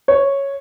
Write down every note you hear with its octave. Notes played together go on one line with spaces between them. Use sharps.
C#5